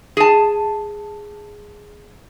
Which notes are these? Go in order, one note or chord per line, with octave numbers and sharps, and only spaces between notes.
G#4 A5